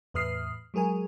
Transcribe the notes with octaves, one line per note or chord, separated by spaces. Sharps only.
E2 A2 B4 D#6 F6 C7
F#3 G#3 G#4 A#4 G#5